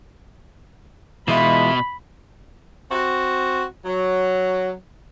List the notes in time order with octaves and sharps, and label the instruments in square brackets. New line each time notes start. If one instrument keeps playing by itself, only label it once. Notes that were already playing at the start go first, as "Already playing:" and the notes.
[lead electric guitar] B2 [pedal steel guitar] E3 G#3 F4 [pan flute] E5 [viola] B5
[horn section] C4 F#4
F#3